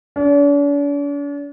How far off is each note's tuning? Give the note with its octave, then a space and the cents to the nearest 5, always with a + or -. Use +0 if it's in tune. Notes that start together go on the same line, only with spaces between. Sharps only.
D4 -45